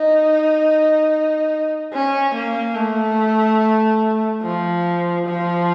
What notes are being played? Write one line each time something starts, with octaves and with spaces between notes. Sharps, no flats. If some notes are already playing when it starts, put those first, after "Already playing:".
Already playing: D#4
C#4
A#3
A3
F3
F3